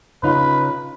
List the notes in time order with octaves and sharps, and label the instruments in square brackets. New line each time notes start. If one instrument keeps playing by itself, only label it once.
[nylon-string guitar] C#3 D#4 F4 [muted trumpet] B4